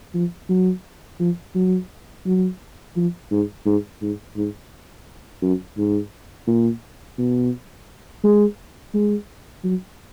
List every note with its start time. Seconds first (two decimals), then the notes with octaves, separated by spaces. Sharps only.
0.14 F3
0.49 F#3
1.20 F3
1.55 F#3
2.26 F#3
2.96 F3
3.31 G#2
3.66 G#2
4.02 G#2
4.36 G#2
5.42 F#2
5.77 G#2
6.47 A#2
7.18 B2
8.24 G#3
8.94 G#3
9.64 F#3